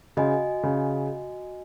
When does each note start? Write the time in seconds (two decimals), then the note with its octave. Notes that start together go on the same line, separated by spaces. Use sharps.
0.17 C#3 F#4 D#5 G#5
0.63 C#3